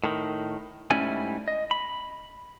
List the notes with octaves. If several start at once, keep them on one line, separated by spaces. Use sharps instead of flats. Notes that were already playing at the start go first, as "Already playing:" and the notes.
A2 D#3
G#2 G3 A3 C#4 E4 G#5
D#5
B5